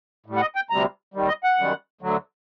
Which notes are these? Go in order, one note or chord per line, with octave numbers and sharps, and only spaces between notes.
A2 G3
F#5
D#5
G5
D2 C3 G3 A#5
D#2 D#3 G3
D#5
F#5
F#2 D#3 G3
D2 D3 F#3